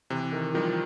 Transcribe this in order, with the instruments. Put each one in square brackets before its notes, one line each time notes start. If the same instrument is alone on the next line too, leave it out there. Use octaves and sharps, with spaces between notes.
[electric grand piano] C3 [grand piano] E3
[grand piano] D#3
[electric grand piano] D#3 G3 [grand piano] F3